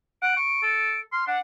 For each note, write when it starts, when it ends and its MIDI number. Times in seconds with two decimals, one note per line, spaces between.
0.22 0.36 78
0.22 1.00 98
0.37 0.58 85
0.62 1.01 69
1.13 1.26 84
1.13 1.25 89
1.27 1.37 62
1.27 1.40 78